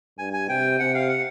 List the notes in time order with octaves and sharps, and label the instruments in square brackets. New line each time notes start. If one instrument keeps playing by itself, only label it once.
[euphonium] G2 [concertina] G#5
[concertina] G#5
[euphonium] C3 [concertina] G5
[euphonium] C3 [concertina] F#5
[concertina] F5
F#5